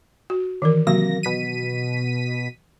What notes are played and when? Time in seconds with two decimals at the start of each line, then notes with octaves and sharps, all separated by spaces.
0.30 F#4
0.62 D#3 E3 A#4
0.87 C3 F#3 A#3 F#4 A#6
1.23 B2 B6 D#7